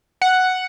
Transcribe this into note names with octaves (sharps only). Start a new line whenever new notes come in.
F#5